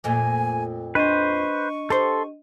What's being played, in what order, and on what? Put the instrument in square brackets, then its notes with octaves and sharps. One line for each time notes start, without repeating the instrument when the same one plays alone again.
[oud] F2 A#2 A3 [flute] G#5
[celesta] D4 D#5 D#7 [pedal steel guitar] B4 C5 [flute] C#6
[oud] G4 C5 [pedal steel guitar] A4 C6